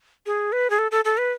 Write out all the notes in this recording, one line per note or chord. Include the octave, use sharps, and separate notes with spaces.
G#4
B4
G#4
A4
A4
A4
B4